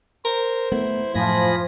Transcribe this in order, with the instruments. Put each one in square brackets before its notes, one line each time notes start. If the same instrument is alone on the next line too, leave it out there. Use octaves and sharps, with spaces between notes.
[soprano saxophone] A#4 [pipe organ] C5
[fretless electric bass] A3 B3 [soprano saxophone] E4
[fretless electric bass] F#2 A2 [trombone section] F3 [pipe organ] G#5 B5 A#6